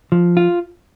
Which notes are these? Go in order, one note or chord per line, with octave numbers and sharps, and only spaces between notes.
F3
F4